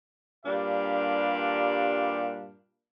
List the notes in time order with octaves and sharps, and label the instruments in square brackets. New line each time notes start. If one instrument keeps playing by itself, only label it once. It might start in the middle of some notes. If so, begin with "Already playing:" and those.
[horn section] G2 A#2 G3 D4 G4 F5